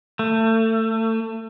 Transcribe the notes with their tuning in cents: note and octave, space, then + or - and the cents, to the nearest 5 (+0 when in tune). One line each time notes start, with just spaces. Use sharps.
A3 +30